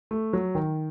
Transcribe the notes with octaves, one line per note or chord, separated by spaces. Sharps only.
A3
F#3
D#3